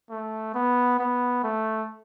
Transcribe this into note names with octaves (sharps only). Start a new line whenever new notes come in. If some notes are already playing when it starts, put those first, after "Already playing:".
A3
B3
B3
A3